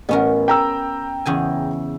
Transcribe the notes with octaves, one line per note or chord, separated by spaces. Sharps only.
A1 B3 C#4 A#4
G5 A#5 E6
E2 C#3 G#5